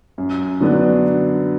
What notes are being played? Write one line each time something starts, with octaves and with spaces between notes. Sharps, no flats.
F#2
D3 F#3 B3 D4